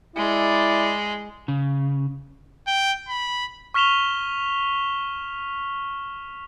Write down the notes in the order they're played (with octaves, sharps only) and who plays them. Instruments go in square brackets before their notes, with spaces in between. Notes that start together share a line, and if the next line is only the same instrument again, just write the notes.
[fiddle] G#3 [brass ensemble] E4 D5
[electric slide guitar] C#3
[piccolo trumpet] G5
B5
[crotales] C#6 F6 B6 E7 F7 G7